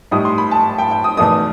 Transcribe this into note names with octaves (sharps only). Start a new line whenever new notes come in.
A2 G3 D#4 D#6
C6
B5
A5
G5
G5
D#6
E2 B2 A3 D#4 D#6